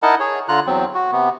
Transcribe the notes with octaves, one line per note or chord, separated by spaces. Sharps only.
D#4 E4 A#4 D#5 F#5 A5
G#4 C#5
D3 F4 A#5 F#6
E2 F#3 C4
F#4
C3 B3